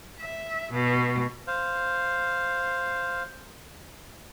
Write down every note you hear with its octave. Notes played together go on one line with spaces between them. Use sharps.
E5
B2
C5 F5